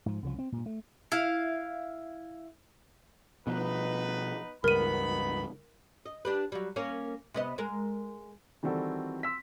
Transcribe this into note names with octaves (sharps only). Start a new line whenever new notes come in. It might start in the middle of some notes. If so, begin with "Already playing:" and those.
G#2 F3
C2 C#3 F3
C4
G2 A#2
A3
E4 F5
B2 F3 B3 D#4 B4
C#2 G2 B3 D#4 A#4 B5 D#7
D#5
D4 G4 B4
F#3 G3
A#3 C#4 C#5
C3 B3 D#5
G#3 A#4
D#3 E3 G3 C4 F#4 A4
C6 E6 B6